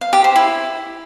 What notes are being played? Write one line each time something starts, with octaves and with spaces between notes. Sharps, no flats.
F5
G4
C5
E4